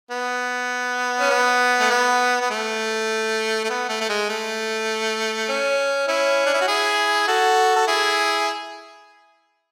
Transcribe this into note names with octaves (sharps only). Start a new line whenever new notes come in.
B3
C#4
B3
A3
B3
B3
A3
A3
B3
A3
A3
G#3
A3
C#4
C#4 E4
D4
E4
F#4
E4 G#4
F#4 A4
A4
E4 G#4